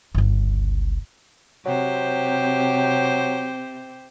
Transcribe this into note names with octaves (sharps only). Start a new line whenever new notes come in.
G1 C#2
C3 F#3 G4 C5